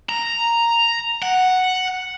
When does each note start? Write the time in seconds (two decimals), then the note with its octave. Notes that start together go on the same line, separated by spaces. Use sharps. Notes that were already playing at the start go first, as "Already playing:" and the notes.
0.09 A#5
1.23 F#5